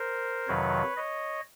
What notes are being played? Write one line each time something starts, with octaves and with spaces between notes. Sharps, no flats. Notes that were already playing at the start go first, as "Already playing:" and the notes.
Already playing: A#4 C5
F2 C3 D#3 F#3 B4 C#5
C#5 D#5